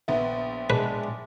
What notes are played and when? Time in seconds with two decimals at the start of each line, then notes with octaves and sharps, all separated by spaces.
0.08 A#1 B3 E5
0.70 G#3 D4 B4